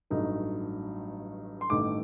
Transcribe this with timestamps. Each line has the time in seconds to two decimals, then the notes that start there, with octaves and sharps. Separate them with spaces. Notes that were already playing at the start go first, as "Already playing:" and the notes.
0.10 A1 G2 F#3 A3 D#4
1.61 C6
1.70 A1 G2 D#3 A3 D6